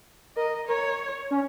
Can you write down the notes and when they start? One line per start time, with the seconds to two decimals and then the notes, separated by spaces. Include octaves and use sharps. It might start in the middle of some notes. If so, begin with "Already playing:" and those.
0.36 A#4 D#5
0.68 A#4 C#5
1.31 C#4